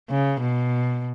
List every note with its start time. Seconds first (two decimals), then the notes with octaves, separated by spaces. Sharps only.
0.10 C#3
0.41 B2